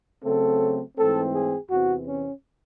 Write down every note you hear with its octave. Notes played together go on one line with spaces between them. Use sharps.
C#3 F#3 A3 C4 A4
G#2 E3 A3 C4 A4
G#4
E2 C3 E3 C4 F#4
C#4